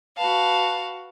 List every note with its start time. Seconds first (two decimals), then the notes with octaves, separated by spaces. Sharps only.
0.16 F#4 B4 F5 A5